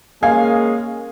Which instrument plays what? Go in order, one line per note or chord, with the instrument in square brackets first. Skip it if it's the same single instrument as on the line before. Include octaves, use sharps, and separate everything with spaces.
[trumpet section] G#3 C#4 G#4 [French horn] A#3 [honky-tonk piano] F5 [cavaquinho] G#5